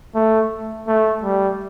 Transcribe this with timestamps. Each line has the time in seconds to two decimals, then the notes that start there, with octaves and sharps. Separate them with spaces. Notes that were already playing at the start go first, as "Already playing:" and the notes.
0.15 A3
0.87 A3
1.23 G3